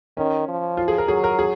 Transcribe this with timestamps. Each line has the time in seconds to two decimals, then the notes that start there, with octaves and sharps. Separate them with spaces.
0.17 D#3 C#4
0.48 F3
0.77 F4
0.88 G#4
0.98 A#4
1.08 F#3 G#4
1.24 A#4
1.39 G#4